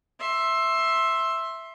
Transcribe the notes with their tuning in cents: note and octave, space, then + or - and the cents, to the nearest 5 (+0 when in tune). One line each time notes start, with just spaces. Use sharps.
E5 +0 C6 +20